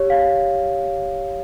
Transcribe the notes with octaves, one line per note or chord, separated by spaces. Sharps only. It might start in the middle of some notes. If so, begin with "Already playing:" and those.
Already playing: G4 C#5
F5